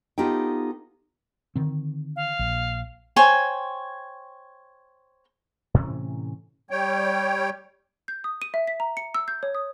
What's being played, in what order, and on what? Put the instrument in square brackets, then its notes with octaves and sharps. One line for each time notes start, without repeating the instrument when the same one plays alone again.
[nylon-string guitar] B3 D#4 F4 G4 A4 G5
[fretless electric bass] D3 D#3 C4
[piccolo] F5
[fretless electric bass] A#1
[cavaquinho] C5 C#5 G5 G#5
[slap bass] A2 C3 E3 C#4
[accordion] G3 C#5 G5
[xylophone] G6
D#6
D#7
E5
B6
A#5
C#7
E6
G6
C#5
D#6